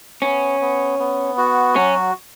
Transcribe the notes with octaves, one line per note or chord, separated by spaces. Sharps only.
B3 C#4
B3
B3
F#4
F#3 C#4